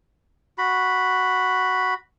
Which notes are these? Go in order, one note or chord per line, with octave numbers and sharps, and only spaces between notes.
F#4 B5